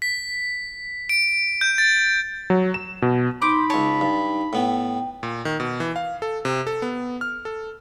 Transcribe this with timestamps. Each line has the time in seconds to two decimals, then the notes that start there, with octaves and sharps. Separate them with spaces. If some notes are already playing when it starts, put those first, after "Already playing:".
0.02 B6
1.09 D7
1.61 G6
1.78 A6
2.50 F#3
2.74 E7
3.02 B2
3.42 D#4 C5 B5 D6
3.70 C#2 C#5 A5
4.01 G2
4.53 A2 B3 G5
5.23 A#2
5.45 D#3
5.60 B2
5.80 E3
5.96 F5
6.22 A4
6.45 C3
6.67 A4
6.82 B3
7.21 F6
7.45 A4